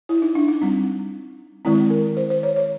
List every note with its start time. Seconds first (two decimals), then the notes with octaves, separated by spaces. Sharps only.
0.09 E4
0.22 D#4
0.35 D4
0.48 D#4
0.62 G3 C4
1.65 D#3 G#3 C4 E4
1.90 A#4
2.17 C5
2.30 C5
2.43 C#5
2.56 C#5